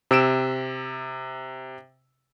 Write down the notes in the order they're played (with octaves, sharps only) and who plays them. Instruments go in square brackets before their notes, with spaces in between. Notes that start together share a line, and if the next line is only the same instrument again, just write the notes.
[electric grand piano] C3 E6 D7 E7